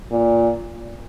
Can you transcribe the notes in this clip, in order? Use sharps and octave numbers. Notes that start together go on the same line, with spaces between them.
A#2